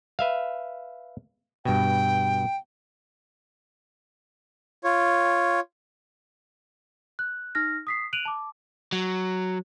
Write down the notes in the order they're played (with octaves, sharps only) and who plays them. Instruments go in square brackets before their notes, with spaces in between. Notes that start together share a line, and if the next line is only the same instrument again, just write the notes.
[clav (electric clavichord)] B4 E5 F5
[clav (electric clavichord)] G2 B2 [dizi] G5
[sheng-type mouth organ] F4 C#5
[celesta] F#6
D#4 F6 A#6
D#6 B6 C7
F#6 D7 D#7 F7 F#7
A5 D6
[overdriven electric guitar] F#3